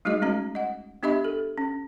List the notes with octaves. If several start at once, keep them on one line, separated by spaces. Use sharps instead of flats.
G3 A3 D#4 F#4 G#4 D#5
G#3 C#4 F#4 D#5 A#5
D#5 F#5
B3 D4 G4 D#5 E5 B5
A4
C#4